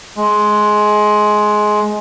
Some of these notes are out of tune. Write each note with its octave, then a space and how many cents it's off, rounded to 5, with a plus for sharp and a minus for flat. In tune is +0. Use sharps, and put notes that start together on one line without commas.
G#3 +15